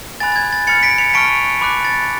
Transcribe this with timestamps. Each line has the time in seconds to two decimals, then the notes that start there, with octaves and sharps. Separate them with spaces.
0.20 G#5 B5 F#6 A6
0.32 A6
0.36 G#6
0.52 A6
0.67 B5 F6 A6 C#7
0.83 B6 D7
0.98 C#7 F7
1.14 A5 C#6 F6 B6 D7
1.61 B5 D6 F#6
1.85 A6